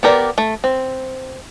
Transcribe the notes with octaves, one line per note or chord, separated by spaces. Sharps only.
B3 G4 A#4 D5
A3
C4